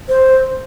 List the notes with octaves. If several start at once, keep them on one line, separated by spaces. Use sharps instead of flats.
C5